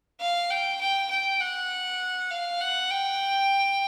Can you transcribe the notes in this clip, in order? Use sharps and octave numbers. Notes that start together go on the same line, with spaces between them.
F5
G5
G5
G5
F#5
F5
F#5
G5